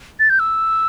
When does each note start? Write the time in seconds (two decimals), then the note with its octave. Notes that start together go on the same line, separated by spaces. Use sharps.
0.20 A6
0.30 G6
0.40 E6